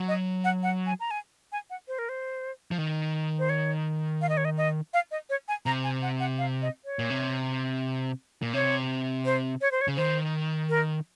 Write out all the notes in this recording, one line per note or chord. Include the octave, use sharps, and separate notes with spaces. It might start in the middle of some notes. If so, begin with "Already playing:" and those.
Already playing: F#3
D#5
F#5
F#5
G#5
A#5
G#5
G#5
F#5
C5
A#4
C5
F3
D#3
C5
C#5
F5
D#5
C#5
D#5
D#5
F5
D#5
C#5
G#5
C3 A#5
G#5
F#5
F#5
F5
D#5
C#5
A#2
C3
A#2
C3 C#5
C5
C#5
C5
C#5
C#3
D#3 C5
A#4